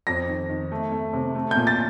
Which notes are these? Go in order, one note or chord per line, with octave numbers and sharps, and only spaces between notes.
F2 A#6
D#3
D#3
A3
A3
C3
A3
G6
A#2
A6